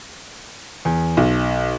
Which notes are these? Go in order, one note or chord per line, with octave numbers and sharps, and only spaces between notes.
E2
B1